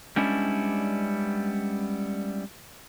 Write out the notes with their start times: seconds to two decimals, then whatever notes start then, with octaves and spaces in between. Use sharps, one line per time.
0.16 G3 G#3 B3 C#4 D4 E4